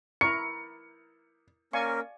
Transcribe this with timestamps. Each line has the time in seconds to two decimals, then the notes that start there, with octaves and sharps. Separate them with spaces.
0.21 E4 A#4 C#6 C#7
1.73 A#3 C#4 A#4 D5 F5 G#5 C#6